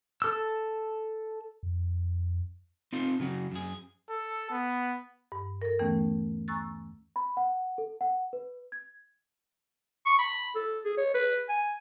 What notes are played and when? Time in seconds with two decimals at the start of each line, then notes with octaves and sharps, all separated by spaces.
0.22 A4 E6
1.63 F2
2.93 C4 D#4 F4 A4
3.20 C#3 F#3 F#4
3.52 F#2 G#4
4.09 A4
4.51 B3
5.32 G2
5.62 A4 A#4
5.79 D#2 D3 E3 A3 B3 C#4
6.48 G#5 A#5 C#6 E6 F#6 A6
7.16 B5
7.37 F#5
7.78 A4
8.01 F#5
8.33 B4
8.72 G#6
10.06 C#6
10.19 B5
10.55 A4
10.85 G#4
10.98 C#5
11.14 B4
11.49 G#5